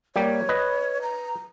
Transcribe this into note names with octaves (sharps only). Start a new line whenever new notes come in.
G3 A#3 G4 C#5
B4 D#5
A#5